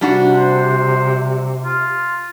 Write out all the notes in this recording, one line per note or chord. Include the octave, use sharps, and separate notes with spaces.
C3 G3 D4 F#4
C5
F4